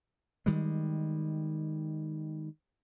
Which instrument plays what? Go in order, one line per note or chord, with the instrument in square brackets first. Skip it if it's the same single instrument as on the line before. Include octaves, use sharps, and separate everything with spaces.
[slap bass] D#3 G3 G#3